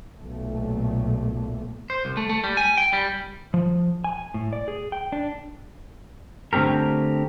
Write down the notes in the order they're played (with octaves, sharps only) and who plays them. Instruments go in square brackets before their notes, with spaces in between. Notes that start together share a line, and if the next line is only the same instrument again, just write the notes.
[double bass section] B1 A#2 A3
[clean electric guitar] C5
C2
A3
A3
G3
G#5
G5
G3
[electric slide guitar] F3
G#5
A2
D5
G#4
G5
D4
D3 A3 C4 G4 A#4